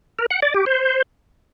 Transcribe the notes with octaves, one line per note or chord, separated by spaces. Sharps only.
A#4
F#5
D5
G4
C5